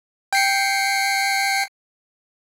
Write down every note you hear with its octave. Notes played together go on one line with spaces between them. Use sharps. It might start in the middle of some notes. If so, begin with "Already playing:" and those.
G5 C7 C#7